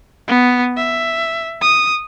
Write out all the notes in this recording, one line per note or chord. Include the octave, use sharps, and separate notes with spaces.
B3
E5
D#6